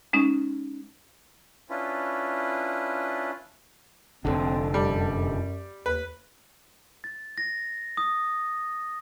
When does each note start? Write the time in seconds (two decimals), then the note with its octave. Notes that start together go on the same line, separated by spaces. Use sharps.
0.13 G#3 C#4 D#4
1.70 C#4 D4 E4 F4 B4
4.25 F1 B1 D3 C4 A4
4.74 F#2 G3
5.86 D#2 B4
7.04 A6
7.38 A#6
7.97 D#6